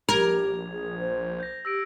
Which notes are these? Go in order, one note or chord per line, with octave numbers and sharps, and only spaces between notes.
A#1 G4 A#4 G#6 F7
G#4
C5
G6 A#6
G4 E6 A#6 D7